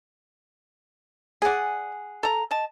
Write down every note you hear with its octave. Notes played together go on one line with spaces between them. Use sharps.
G#4 D5 F#5 G#5
A4 A#5
D#5 A5